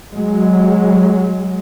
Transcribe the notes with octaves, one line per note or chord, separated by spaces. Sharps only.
F#3 G#3